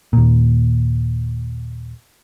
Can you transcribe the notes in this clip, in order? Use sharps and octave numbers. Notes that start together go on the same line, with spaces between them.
D#2 A#2